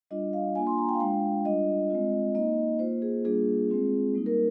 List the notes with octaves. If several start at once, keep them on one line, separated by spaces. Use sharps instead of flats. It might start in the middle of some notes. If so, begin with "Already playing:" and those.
G3 D4 F4 D#5
F5
A#3 D4 F4 G#5
C6
A#5
G5
F5
G#3 D4 F4 G5
G3 D4 F4 D#5
G#3 C4 F4
A#3 D#4 D#5
A#3 F4 C5
G#4
G3 A#3 D4 F4 G#4
G#3 C4 F4
G3 A#3 D#4
A#4